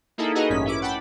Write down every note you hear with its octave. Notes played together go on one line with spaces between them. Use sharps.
A#3 D#4 E4 G#4 A4
D#4 F#4 G#4 A#4 B4 D#5
A1 G2 C#4 B6
C#4 E4 D6
F#5 G5 A5 B5